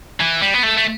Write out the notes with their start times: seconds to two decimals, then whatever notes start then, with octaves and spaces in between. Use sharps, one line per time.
0.21 E3
0.42 G3
0.54 B3
0.63 A3
0.77 A3